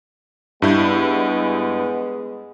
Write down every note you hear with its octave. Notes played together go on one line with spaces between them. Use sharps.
G2 G#3 B3 E4 G6